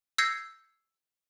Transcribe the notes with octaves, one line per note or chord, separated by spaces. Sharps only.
E6 G6 G#6 A#6 C7 C#7